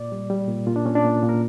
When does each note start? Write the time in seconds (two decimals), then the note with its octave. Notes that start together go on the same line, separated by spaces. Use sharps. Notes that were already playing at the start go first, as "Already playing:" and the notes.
Already playing: A#2 D5
0.12 G3
0.30 G3
0.48 A#2
0.67 A#2 F4
0.76 D4
0.86 A#2 C#4
0.95 D4
1.04 A#2
1.22 A#2
1.29 A#4